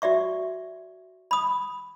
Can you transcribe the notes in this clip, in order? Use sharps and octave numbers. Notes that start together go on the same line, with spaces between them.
F#4 D5 E5 C#6
B5 D#6